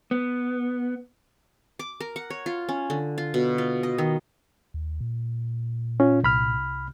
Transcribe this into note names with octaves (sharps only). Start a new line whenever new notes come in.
B3
D6
A#4
F#5
C#5
F4
C#4
D3
F4
B2
F4
D#5
D#3
D#2
A#2
C#4 F4
C2 B5 F6